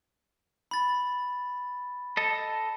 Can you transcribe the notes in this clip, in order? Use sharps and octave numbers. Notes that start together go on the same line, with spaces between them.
B5 A6
A4 D#5